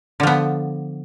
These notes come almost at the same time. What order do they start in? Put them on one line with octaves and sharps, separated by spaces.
D3 F3 B3